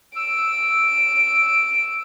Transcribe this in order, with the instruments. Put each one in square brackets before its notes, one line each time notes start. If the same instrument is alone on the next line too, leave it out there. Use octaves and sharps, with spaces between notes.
[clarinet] E6 [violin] D7